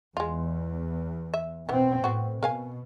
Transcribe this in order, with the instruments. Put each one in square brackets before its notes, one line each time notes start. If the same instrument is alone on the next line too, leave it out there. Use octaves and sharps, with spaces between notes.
[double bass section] E2 [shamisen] G#3 F4
[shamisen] E5
[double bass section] B2 C4 [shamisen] E3 B3
[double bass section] A2 [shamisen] B3 F#4
[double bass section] B2 [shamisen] A#4 F5 G#5